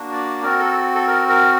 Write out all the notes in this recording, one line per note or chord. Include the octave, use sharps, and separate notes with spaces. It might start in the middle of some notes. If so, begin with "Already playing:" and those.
Already playing: A#3 D4 F#4
D5
C4 F#4 A#4
A4
A4
A#4
A#4